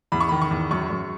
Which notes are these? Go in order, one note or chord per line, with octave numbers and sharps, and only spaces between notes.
E2 B5
C#6
D#3 B5
C#6
E2
F#2 C#6
F#2